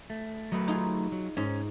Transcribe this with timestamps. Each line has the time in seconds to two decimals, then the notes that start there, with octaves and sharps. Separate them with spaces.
0.10 A3
0.52 F#3 A3 B4 D#5
0.68 D#4 F4 G#4
1.12 F#3
1.37 G#2 C#4